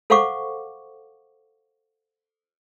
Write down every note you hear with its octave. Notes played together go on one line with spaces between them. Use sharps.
A4 C5 F5 F#5 C#6 D6